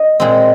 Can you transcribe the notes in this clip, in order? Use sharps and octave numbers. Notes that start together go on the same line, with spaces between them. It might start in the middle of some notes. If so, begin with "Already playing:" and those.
Already playing: D#5
A#2 G#3 C4